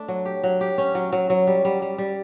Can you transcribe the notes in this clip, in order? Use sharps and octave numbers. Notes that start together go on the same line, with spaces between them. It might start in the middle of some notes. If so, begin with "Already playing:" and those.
Already playing: A3 D4
F#3
G4
F#3
G4
C#4
F#3
F#3
F#3
G3
G3
G3
G3